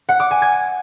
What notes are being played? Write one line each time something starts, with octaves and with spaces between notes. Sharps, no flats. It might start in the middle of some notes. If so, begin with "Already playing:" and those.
F#5
D6
G#5
G#6